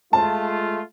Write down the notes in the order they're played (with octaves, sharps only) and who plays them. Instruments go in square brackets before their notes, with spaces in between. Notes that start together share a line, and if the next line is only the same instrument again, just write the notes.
[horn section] G#3 A3 F4 [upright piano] A5